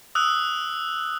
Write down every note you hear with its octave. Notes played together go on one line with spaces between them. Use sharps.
D#6 E6 F#6